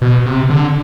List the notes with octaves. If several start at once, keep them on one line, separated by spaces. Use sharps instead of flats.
B2
C3
D3